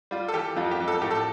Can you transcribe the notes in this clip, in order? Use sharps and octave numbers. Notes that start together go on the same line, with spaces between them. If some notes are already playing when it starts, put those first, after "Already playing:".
G3 F4
A4
E3 G4
F2 F4
G4
F2
A4
A2 G4
A4